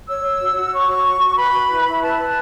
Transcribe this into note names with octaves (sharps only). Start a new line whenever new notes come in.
C#5 E6
C#5
F#4
F#4
C#5 C#6
C#5
F#4
F#4
B4 B5
B4
E4
E4
B4 A5
B4